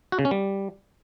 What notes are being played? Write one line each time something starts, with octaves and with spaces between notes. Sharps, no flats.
F#4
C#3
C#4
G3